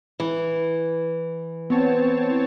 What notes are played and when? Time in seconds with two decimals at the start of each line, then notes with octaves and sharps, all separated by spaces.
0.20 E3
1.70 B3 C4 C#5 A5